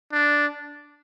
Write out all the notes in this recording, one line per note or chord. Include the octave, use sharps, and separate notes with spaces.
D4